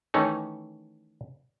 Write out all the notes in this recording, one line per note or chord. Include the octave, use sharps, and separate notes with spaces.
D#3 E3 A3 C#4 D#4